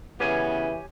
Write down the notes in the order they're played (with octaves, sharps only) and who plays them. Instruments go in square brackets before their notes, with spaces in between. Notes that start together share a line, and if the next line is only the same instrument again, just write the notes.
[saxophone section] C#3 B3 [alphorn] E3 [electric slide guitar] G4 C#5 G#5